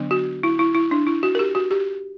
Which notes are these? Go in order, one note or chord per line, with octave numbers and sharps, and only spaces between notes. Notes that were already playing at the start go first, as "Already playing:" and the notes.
Already playing: D3 F#3 B3 D4
F#4
E4
E4
E4
D4
E4
F#4
A#4
G4
F#4
G4